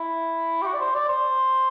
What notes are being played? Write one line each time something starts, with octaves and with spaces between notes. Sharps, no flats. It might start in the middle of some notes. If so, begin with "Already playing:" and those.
Already playing: E4
G4
F#4
D5
C5
D5
C5